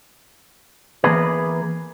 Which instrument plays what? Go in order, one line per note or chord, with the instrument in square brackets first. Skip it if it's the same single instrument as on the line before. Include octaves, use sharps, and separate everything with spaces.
[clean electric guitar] E3 A#3 B3 G#4 B4